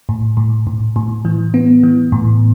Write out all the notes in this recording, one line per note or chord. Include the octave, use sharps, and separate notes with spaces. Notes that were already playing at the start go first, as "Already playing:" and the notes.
A2
A2
A2
A2
E3
B3
E3
A2